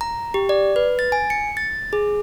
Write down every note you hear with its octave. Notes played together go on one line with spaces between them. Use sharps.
A#5
G4
D5
B4
A6
G#5
C#7
A6
G#4